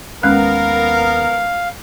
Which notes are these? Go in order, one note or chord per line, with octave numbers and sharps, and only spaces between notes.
D#2 G#3 B3 C#4 A#4 F5 F#6